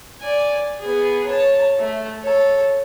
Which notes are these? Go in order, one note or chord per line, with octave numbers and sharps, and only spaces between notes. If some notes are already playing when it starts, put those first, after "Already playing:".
D5 G#5
B3 G#4
C#5 A5
A3
A4 C#5